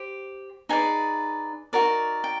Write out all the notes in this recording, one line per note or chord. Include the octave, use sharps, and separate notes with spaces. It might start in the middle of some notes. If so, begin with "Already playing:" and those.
Already playing: G4 C5
D#4 G#4 B4 D5 G#5
D#4 F#4 A#4 D5
G5